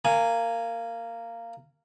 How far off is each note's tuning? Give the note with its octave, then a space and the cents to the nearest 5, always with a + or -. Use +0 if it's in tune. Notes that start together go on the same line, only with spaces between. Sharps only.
A#3 -15 G#5 +0